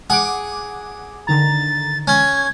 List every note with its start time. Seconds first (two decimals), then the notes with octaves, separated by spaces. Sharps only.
0.10 G#4 F#5 D6
1.27 D3 D#3 A#5 A6
2.08 C#4 G#6